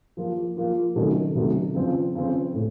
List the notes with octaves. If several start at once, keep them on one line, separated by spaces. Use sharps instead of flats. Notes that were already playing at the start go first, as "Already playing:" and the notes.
F3 A#3 F4
F3 A#3 F4
C3 D#3 F#3 A3 C#4
C3 D#3 F#3 A3 C#4
C#3 F3 C4
C#3 F3 C4
A2